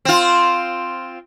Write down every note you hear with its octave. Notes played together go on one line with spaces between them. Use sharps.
C4 F4